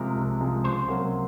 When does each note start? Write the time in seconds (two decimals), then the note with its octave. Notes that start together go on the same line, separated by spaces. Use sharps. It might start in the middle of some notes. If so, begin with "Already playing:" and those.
Already playing: C3 F3 G#3 A#4
0.16 C2
0.41 C3 F3 G#3
0.64 C#2 C5
0.88 C3 F#3 A#3 C#4